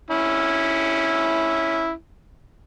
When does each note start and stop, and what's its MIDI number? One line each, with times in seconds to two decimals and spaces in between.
0.11 1.91 61
0.11 1.91 64